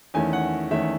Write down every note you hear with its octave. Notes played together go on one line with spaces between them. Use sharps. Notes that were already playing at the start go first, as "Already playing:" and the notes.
E2 D#3 A3 C#4 G#5
F#5
E2 D#3 A3 C#4 E5